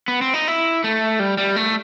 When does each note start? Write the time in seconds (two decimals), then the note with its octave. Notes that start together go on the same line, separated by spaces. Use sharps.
0.08 B3
0.21 C4
0.34 D#4
0.48 E4
0.84 A3
1.20 G3
1.38 G3
1.56 A3